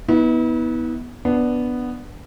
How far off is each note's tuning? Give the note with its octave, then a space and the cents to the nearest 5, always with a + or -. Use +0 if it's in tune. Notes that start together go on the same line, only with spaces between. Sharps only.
B3 -10 E4 -45
B3 +0 D4 +0